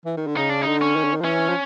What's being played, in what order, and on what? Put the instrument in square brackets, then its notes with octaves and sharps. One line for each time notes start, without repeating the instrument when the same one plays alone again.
[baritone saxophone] E3
D#3
D3
[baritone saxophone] C#3 [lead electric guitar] D#4
[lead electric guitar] D4
[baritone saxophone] D3 [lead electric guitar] D#4
[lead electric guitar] C#4
[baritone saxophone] D#3
D3
D#3
F3
[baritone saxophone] E3 [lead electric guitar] C#4
[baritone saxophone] F3